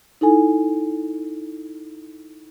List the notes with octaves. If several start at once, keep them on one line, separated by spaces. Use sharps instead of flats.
D#4 E4 A4 G#5